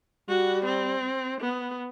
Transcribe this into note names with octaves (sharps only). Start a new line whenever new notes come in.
G3 F#4
C4
B3